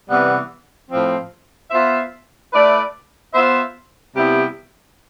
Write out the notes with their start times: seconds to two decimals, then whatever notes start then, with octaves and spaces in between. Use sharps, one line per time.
0.09 C3 E3 G3 B3
0.89 A2 F3 C4
1.71 B3 F4 C5 E5
2.52 A3 E4 B4 D5
3.34 B3 F4 C5 E5
4.15 C3 G3 B3 E4 G4